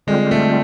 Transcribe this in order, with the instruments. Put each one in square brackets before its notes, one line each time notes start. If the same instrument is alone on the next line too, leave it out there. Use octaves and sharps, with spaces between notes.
[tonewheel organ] D3 G3 C4 F4 [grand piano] G#3
[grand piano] A3